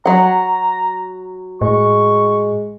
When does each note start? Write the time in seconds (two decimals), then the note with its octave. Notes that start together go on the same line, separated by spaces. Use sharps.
0.06 F#3 F#5 A#5
1.61 A2 G#3 C#6